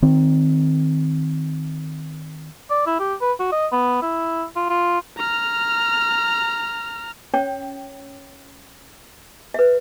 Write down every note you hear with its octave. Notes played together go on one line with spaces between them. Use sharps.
D#3 C4
D5
E4
G4
B4
F#4
D#5
B3
E4
F4
F4
A#5 F6
C#4 C#5 G5
B4 E5